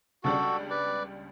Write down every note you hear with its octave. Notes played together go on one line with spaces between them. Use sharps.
C#2 C#3 G3 D4 F#4 A4
B4 D5